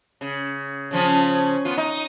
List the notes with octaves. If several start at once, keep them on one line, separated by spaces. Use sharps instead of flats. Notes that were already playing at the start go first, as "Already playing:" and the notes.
C#3
C#3 F3 C#4
B3 F4
D#4